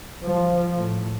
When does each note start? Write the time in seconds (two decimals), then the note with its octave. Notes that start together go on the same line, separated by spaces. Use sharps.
0.23 F3
0.74 A2